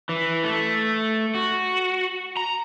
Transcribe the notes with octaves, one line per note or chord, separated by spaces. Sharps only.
E3
A3
F#4
A#5